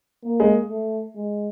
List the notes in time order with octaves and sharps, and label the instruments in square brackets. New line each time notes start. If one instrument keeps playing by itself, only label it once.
[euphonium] A#3
[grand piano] G#3
[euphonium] A3
G#3